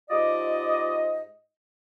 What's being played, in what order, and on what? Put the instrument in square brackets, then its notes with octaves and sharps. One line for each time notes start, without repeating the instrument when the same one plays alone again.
[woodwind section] G#2 F4 G4 D5 D#5